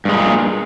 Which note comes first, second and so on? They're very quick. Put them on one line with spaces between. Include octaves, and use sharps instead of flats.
G2 G#3 A#2